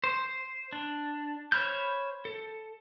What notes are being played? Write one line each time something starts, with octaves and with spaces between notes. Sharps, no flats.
C5
D4
C5 C#5 B5 F6 G6
A4